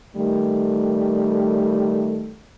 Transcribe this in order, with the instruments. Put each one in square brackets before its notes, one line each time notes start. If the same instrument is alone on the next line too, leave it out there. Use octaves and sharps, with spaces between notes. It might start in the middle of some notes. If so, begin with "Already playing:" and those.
[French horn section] D#3 G3 A3